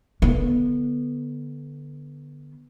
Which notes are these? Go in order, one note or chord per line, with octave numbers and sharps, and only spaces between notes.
D3 B3